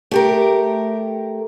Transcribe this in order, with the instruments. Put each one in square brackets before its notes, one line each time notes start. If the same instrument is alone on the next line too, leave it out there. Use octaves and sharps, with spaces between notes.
[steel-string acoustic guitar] A3 G4 A#4